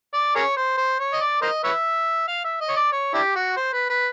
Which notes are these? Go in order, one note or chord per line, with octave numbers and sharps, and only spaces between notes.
D5
G#4 A#4 C#5
C5
C5
C#5
D#5
D5
A#4 C5 D#5
B4 C#5 E5
F5
E5
D#5
C#5
D5
C#5
D4 E4 G4
F#4
C5
B4
B4